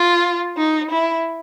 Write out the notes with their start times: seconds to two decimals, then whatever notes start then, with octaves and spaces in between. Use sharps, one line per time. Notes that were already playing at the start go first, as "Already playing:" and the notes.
Already playing: F4
0.57 D#4
0.91 E4